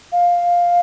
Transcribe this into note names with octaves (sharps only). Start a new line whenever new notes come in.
F5